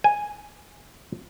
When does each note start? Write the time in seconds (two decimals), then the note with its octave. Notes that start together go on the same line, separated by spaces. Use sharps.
0.04 G#5